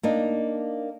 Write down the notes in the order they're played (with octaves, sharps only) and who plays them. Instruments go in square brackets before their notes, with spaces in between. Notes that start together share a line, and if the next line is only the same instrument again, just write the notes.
[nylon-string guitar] A#3 D4 D#4